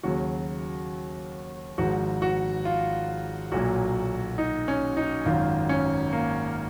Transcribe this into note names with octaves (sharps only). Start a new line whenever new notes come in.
D#2 C#3 F#3 F#4
G#1 G#2 F3 F#4
F#4
F4
B1 A#2 F#3 F#4
D#4
C#4
D#4
G#1 F#2 D#3 F#3 F4
C#4
A#3